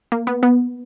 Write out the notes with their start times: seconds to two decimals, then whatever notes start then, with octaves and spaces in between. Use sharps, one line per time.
0.12 A#3
0.27 B3
0.43 B3